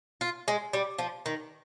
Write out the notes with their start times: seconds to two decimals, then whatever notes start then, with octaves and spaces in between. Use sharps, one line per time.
0.21 F4
0.48 G#3
0.73 G3
0.98 F3
1.26 D#3